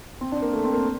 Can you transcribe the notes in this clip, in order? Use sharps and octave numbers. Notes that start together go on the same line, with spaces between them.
C4
D4
A#3
A3
C4
A#3